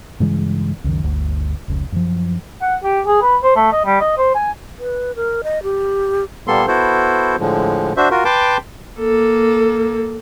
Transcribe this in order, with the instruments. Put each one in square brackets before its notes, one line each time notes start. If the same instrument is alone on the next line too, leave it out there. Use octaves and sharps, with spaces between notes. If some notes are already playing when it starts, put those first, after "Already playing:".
[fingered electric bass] G2 C#3 E3 G#3
C#2 F#2 D#3
G1 D2
F1 C#2
F#2 F3
[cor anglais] F#5
G4
G#4
B4
C5
A3
D#5
G3
D#5
C5
G#5
[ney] B4
A#4
D#5
G4
[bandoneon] A#2 G3 A#3 B3 A4 C6
B3 E4 F#4 A4 C5
A2 D3 F3 G#3
D4 F#4 C5 E5
F4 F#4 A#4
B4 G5 A5 C6 D6
[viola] A#3 A4